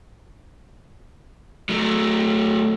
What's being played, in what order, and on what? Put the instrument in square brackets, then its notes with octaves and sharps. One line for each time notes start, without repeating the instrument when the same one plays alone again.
[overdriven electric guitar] F#3 A3